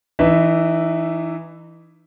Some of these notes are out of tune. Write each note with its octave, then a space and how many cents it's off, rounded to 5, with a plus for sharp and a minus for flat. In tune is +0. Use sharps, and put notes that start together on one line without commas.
E3 +0 D#4 -30 E5 +0